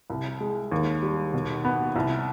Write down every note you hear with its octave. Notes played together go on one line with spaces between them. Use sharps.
C2
G#3
D#2
G3
B2
B3
C2